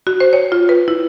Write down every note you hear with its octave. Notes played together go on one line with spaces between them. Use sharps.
F#4
C5
C#5
F4
B4
E4